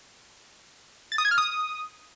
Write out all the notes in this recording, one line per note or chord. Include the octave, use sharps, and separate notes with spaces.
A6
D#6
G#6
F6
D#6